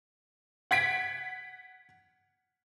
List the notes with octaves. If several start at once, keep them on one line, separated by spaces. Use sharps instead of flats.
F#5 G#6 B6 D7